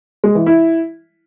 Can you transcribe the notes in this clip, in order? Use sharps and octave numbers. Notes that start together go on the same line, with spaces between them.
G#3
E3
E4